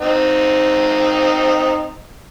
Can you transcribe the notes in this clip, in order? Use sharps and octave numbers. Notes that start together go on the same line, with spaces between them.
C4 D#4